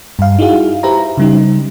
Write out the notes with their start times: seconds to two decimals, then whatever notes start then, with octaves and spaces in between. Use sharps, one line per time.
0.19 G2 F5
0.39 D#4 E4 F#4 G#4 F5
0.83 G4 B4 C5 E5 A#5
1.17 C#3 G3 D#4